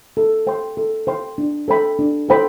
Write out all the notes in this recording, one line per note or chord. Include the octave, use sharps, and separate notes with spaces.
A4
C5 G5 C6
A4
C5 G5 C6
D4
A4 C5 G5 B5
D4
A4 C5 G5 B5